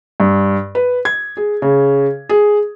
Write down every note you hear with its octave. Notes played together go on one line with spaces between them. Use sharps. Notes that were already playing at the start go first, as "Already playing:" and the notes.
G2
B4
G#6
G#4
C#3
G#4